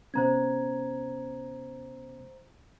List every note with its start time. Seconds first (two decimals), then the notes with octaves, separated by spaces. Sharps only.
0.14 C3 B3 C#4 C5 A#5 G#6